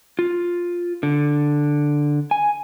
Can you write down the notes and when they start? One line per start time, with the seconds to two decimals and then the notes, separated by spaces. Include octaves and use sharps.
0.19 F4
1.03 D3
2.31 G#5